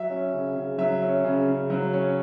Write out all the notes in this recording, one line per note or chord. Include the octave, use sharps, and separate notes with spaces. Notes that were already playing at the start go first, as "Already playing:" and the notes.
Already playing: F#3 E5
C#4
C#3
C#3
F#3 E5
C#4
C#3
C#3
F#3
C#4